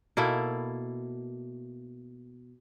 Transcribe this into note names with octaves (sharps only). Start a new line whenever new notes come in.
B2 A#3 E4 A4